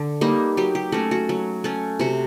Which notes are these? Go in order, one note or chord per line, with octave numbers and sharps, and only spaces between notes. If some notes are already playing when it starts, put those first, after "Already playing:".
Already playing: D3
G3 A#3 D#4
F#3 G4
G4
A3 C#4 F#4
F#4
F#3
A3 C#4
C3 F#4